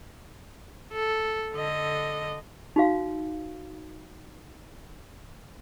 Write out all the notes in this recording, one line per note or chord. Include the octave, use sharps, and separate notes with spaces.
A4
D3 D#5
D#4 F#4 F5